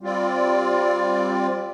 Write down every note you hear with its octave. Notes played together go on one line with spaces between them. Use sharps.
G3 C4 F4 D5